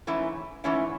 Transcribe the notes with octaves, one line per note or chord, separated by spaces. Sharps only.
G#2 E3 A3 C#4 E4
G#2 E3 A3 C#4 E4